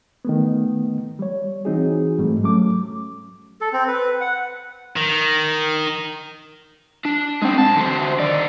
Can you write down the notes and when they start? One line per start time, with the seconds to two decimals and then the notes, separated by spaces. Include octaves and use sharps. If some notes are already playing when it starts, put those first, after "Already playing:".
0.25 D#3 A3 B3
1.19 G3 C#5
1.65 E3 C4 D#4 F#4 G#4
2.19 G#2 G3 A3
2.43 F#3 A3 C#4 D6
3.61 A4
3.73 C4
3.88 B4
4.21 F#5
4.97 D#3
7.05 D4
7.42 G#3 C4
7.58 B1 A5
7.77 D3 C5
8.19 D#3 D5